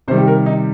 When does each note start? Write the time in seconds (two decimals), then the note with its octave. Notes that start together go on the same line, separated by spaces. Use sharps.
0.08 C3 D#3 G3 C5
0.18 G4
0.27 A#4
0.46 D#4